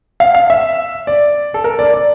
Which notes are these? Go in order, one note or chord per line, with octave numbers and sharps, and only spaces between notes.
F5
F5
E5
D5
A4
A#4
D5
D5